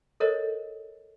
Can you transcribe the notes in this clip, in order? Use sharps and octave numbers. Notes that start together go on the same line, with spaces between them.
A4 A#4 C5 C#5 D#5